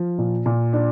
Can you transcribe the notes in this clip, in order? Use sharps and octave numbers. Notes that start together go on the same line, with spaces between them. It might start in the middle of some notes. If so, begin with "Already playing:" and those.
Already playing: F3
A#2
A#2
D4